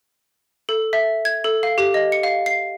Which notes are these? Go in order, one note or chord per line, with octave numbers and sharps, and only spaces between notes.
A4
E5
G#6
A4
F5
G4
D#5
C#7
F5
C7